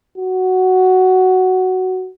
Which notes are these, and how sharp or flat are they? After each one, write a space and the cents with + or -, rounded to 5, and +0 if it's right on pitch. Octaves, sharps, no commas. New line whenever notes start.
F#4 +5